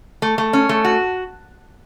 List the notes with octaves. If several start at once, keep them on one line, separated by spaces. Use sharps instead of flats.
A3
A3
C#4
A3
F#4